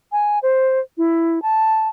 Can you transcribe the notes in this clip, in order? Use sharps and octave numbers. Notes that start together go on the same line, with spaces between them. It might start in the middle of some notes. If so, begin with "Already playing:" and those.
G#5
C5
E4
A5